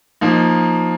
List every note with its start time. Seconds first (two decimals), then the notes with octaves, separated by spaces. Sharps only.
0.21 F3 A#3 D#4